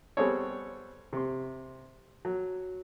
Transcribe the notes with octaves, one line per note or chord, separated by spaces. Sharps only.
G3 B3 C4 G#4 A4 C#5
C3 C6
F#3